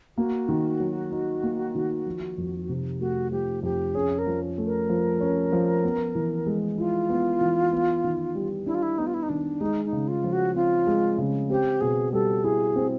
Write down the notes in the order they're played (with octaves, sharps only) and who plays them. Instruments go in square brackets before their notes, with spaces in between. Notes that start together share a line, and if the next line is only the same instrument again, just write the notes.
[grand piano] A#3 [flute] F#4
[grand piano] D#3
F#3
D#4
A#3
D#3
F3
F2
C3
[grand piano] A3 [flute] F#4
[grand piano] F3 [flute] G4
[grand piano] F2 [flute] G4
[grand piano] C#4 [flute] G#4
[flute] A#4
[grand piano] F3
A3
[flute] A#4
[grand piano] F3
C#4
F3
B3
E3
G#3
[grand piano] E4 [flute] F4
[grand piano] B3
E3
B3
D#3
G3
[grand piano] D4 [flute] E4
[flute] F4
E4
[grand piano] B3 [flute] D#4
[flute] F4
E4
D#4
[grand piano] D#3 [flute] D4
[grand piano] G#3 [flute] D#4
[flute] D#4
[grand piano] C#3
[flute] F4
[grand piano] F3
[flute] F#4
[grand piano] C4 [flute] F4
[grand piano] G#3
C#3
[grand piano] C4 [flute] G4
[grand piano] B2 [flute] G#4
[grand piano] G3 [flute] A4
[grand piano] E4 [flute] G#4
[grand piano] C4